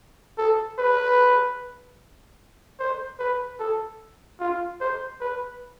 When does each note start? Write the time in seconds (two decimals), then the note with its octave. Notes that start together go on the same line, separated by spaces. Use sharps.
0.38 A4
0.79 B4
2.79 C5
3.19 B4
3.60 A4
4.40 F4
4.81 C5
5.21 B4